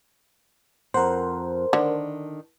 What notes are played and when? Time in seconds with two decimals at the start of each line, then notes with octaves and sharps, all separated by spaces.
0.94 F2 A#4 C5 F#5
1.73 D3 D#3 D4